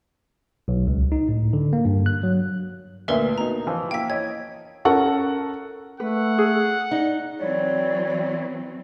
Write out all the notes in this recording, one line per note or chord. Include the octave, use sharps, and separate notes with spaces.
B1
C#2
D#4
A2
D3
A#3
G2
F#6
F#3
D2 A#2 A#4 B4 E5
B2 D#4 A#5
E3 F3
A#3 E4 G5 B6
C#5 D#5 G#6
C#4 A4 A#4 F#5 C#6
A3 B4 F#5
G#4
D#4 D5
E3 F#3 C4 C#5 D5